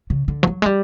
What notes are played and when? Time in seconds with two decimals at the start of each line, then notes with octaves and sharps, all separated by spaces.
0.10 C#3
0.28 D3
0.43 F3
0.47 F#3
0.62 G#3
0.66 G3